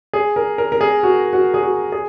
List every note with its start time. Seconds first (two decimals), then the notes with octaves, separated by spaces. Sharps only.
0.13 G#4
0.36 A#4
0.58 A#4
0.72 A#4
0.81 G#4
1.03 F#4
1.33 F#4
1.54 G#4
1.63 F#4
1.92 G#4